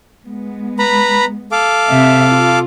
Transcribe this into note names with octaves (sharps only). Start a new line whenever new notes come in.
G#3 B3
B4 A#5 B5
A4 F5 D6
C3 E5
F4